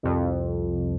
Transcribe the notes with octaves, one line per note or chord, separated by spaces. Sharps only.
C2 F2